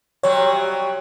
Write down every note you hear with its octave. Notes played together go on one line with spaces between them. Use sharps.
C3 F#3 G3 C#5